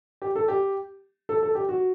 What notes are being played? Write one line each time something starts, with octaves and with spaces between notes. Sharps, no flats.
G4
A4
G4
A4
A4
G4
F#4